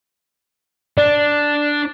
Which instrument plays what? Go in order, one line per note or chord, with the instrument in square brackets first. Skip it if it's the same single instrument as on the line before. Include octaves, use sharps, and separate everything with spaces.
[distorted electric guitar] D4 [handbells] D5